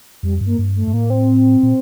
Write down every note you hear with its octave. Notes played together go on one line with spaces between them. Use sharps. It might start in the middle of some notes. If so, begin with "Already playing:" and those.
F2 G3
G2
A#3
G2
A3
G2
A2 A#3
C4
A#2